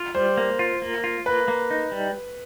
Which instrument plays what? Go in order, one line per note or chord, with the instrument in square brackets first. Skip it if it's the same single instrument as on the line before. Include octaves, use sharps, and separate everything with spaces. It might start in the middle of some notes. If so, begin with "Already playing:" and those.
Already playing: [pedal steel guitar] F4
[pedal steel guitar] G3 [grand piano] C5
[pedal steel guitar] A#3
F4
A#3
F4
[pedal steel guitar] A#3 [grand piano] B4
[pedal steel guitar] A#3
D#4
G3